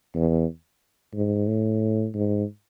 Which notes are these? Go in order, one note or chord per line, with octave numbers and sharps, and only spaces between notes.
E2
G#2
A2
G#2